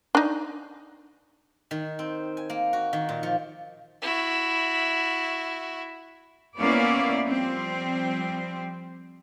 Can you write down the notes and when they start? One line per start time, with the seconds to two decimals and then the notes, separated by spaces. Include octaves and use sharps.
0.15 D4 D#4
1.71 D#3
1.99 C4
2.37 G#5
2.50 A#3
2.73 F#4
2.93 D#3
3.09 A#2
3.23 F3
4.02 E4 F#4
6.58 A#3 B3 C#4 E4 D5 F5
7.26 F3 G3 C4